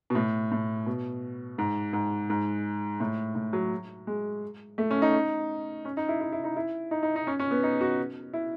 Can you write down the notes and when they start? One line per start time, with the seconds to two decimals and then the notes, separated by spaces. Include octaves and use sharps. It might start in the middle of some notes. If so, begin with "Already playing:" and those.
0.10 B2
0.15 A2
0.52 A2
0.86 B2
1.58 G#2
1.93 G#2
2.30 G#2
3.00 A2
3.35 A2
3.53 F#3
4.07 G#3
4.78 A3
4.91 C#4
5.02 D#4
5.85 C#4
5.97 D#4
6.09 E4
6.21 E4
6.32 E4
6.44 D#4
6.56 E4
6.91 D#4
7.03 D#4
7.16 D#4
7.27 C#4
7.40 C#4
7.51 B3
7.63 D#4
7.81 F#4
8.33 E4